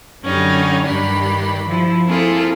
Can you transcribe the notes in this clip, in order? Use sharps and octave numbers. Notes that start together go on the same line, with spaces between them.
F#2 D3 F#3 G3 C#4 D#4
G2 D#3 D4 G4 B5
F3 E4
A#3 C4 E4 F4 G#4 A4